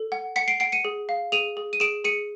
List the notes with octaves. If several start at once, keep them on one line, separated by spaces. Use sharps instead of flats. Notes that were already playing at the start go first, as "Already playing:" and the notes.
Already playing: A4
F#5
F#5 B6 C#7
C7 D7
F#5 C7 D7
C#7 D#7
G#4
F5
G#4 D#7 F7
G#4
D#7
G#4 D7 E7
G#4 C#7 D#7